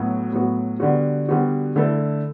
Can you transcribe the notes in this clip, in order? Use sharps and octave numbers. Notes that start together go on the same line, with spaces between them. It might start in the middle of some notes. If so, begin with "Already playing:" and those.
Already playing: A2 F#3 B3 F#4
A2 F#3 B3 F#4
D3 G3 B3 F#4
D3 G3 B3 F#4
D3 A3 E4 A4